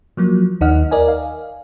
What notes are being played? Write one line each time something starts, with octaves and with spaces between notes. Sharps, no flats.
F3 F#3 A#3
D#2 D#4 D#5 F#5 F6
A#4 D5 D#5 G#5
F5